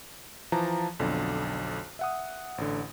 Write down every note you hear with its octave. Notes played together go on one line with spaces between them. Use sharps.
E3 F3 A5 A#5
B1 F2 D3
E5 F#5 D#6
A1 D3